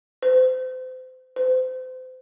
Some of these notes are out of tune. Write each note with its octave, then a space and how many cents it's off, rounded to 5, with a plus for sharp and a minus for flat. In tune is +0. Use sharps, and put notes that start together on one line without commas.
C5 -35
C5 -35